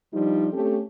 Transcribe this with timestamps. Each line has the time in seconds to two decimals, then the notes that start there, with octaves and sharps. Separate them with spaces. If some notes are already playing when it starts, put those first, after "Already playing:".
0.14 F3 G3 D4 D#4
0.53 A3 C4 C#4 G4 A4